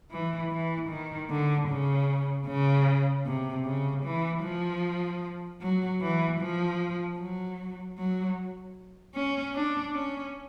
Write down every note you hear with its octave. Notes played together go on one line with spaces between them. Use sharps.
E3
E3
D#3
D3
C#3
C#3
C3
C#3
E3
F3
F#3
E3
F3
F#3
F#3
C#4
D4
C#4